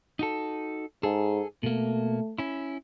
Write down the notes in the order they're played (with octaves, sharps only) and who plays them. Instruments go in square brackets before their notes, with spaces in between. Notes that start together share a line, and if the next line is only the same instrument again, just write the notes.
[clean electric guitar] D#4 F#4 A4
[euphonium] G#2 [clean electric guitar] G#4 A4
[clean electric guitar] B2 A#3 [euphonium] A3
[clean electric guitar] C#4 E4